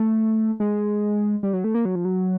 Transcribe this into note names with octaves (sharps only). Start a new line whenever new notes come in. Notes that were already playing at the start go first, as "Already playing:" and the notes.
Already playing: A3
G#3
G3
F#3
A3
A#3
F#3
F3
F#3